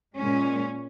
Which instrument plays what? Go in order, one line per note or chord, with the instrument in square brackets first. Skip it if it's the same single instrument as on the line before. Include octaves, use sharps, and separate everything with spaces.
[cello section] A#2 G#3 C#4